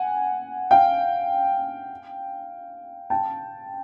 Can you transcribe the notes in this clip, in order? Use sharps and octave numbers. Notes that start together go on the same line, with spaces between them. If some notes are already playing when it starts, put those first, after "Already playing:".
Already playing: F#5 G#5
F5 G5
G5 A5